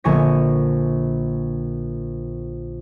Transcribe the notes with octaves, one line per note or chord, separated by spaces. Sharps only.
A#1 D3 G#5 C#6 A#6